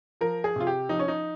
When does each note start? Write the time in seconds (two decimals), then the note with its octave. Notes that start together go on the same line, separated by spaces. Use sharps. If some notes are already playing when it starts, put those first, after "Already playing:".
0.21 F3 A#4
0.44 G#4
0.56 C3 F4
0.67 G4
0.89 F3 D#4
0.99 C#4
1.08 D#4